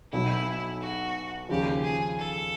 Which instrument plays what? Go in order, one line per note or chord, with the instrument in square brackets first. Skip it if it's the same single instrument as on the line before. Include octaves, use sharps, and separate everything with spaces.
[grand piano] B1 B2 F#3 [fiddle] E4
[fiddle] F#4
[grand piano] D#2 C#3 F3 [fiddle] G4
[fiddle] G#4
A4